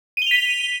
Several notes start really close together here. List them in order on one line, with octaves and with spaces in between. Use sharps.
D#7 G7 F7 B6